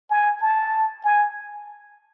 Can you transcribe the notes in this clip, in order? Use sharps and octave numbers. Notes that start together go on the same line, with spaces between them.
G#5
A5
G#5